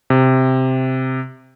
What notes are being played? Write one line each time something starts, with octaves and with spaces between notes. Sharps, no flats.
C3